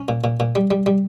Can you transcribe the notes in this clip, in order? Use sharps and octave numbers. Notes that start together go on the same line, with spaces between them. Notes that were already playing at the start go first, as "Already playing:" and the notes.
Already playing: C#4
A#2
A#2
A#2
G3
G3
G3